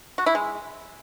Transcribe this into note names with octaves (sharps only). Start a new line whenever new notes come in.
F#4
E4
G#3